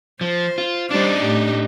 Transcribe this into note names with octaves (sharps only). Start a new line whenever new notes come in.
F3 C5
F4
G3 D4 D#4 C5 D5
A2 G4